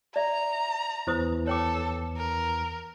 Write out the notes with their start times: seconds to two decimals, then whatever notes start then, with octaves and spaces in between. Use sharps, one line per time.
0.16 D5 E5 A#5
1.07 E2 E3 E4 C5 D#6
1.47 A4 C#5 G5 D6
2.17 A#4